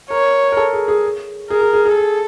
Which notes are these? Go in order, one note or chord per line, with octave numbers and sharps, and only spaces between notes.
A#4 C#5
A#4
A4
G#4
G#4
G#4 A#4
G#4
G#4
G#4
A4